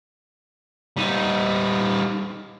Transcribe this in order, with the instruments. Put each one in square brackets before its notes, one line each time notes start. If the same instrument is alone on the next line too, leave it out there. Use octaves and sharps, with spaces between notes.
[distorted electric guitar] G3 D#4